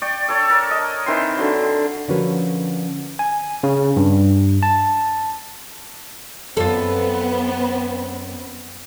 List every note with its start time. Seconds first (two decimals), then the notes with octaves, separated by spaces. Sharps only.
0.02 D5 G5 C#6
0.28 A4 C#5 D5
0.50 A#4
0.71 D#5
1.06 D#3 E3 C4 C6
1.37 D3 F#3
2.08 D3 F3 C#4 F#4 A#4 B4
3.19 G#5
3.63 C#3
3.97 G2
4.63 A5
6.57 F#2 B3 C4 F4 A4